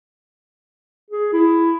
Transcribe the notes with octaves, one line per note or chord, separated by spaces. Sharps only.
G#4
E4